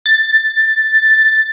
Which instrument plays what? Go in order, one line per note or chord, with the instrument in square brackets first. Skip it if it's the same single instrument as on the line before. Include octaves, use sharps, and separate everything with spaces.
[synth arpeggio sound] A6